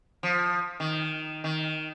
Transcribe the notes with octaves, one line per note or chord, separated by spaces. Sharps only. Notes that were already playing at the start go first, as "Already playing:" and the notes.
F3
D#3
D#3